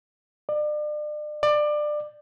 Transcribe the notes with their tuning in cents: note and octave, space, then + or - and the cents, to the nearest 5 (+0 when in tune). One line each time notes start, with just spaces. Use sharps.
D5 +40
D5 +25